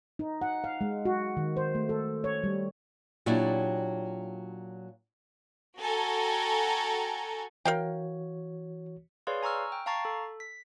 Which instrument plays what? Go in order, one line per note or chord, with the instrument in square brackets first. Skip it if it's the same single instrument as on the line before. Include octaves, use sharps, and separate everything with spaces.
[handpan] D#4
F#5
F5
G#3
F#4
D#3
C5
A3
A4
C#5
G3
[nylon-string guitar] A#2 F#3 C#4 D4 E4 G4
[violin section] F#4 A4 G5 G#5 A#5
[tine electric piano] E3 F#4 C#5 [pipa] A#4 F5 G5
[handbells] G#4 B4 C#5 D5 F5 C6
G#5 A#5 C#6 E6 F6
G5
F5 A5 A#5 C#6 A6 C7
A4
B6